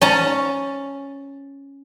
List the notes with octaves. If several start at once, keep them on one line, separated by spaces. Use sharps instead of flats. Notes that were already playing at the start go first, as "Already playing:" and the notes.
C#4 A5 A#5